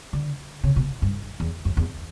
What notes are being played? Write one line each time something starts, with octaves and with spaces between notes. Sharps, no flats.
D3
C#3
B2
G2
E2
F#2
E2